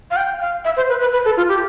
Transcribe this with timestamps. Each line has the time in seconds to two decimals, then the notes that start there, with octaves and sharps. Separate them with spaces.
0.11 F5
0.16 G5
0.41 F5
0.65 E5
0.77 C5
0.89 B4
1.01 B4
1.13 B4
1.25 A4
1.37 F4
1.49 G4